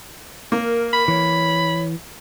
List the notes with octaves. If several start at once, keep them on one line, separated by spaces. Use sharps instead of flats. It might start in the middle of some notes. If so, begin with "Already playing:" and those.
A#3 A#4
B5
E3 C#5